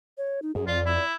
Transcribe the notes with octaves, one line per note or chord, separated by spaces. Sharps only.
C#5
D#4
F#2 G#4
F2 F4 D5
E4